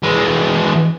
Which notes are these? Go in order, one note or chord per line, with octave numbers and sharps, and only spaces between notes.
E3 G#3